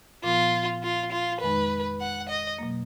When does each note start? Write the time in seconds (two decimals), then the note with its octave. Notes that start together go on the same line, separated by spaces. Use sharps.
0.24 A#2 F3 B3 F4
0.83 F4
1.12 F4
1.41 F2 D#3 G#3 D#4 B4
2.00 F#5
2.29 D#5
2.58 B2 F#3 A#3